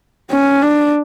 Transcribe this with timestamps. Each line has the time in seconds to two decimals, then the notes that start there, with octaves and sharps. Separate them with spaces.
0.30 C#4
0.62 D4